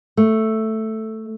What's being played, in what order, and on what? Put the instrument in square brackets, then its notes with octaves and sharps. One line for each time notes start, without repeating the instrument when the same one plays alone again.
[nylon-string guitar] A3